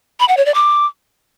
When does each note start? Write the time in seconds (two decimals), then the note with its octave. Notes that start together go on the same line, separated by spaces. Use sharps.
0.20 B5
0.28 F#5
0.37 C#5
0.46 D5
0.54 D6